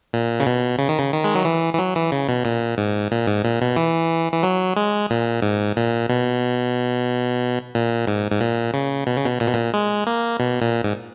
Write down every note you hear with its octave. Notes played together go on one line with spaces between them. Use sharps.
A#2
C#3
B2
C#3
D#3
C#3
D#3
G#3
F#3
E3
E3
F#3
E3
C#3
B2
A#2
G#2
A#2
G#2
A#2
B2
E3
E3
F#3
G#3
A#2
G#2
A#2
B2
A#2
G#2
G#2
A#2
C#3
B2
C#3
B2
A#2
B2
A#2
G#3
A#3
B2
A#2
G#2